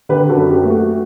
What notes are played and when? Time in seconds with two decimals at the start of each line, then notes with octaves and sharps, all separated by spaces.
0.09 D3 G4 B4
0.29 F#4 A4
0.36 F#2
0.50 G4
0.63 A3
0.70 F#4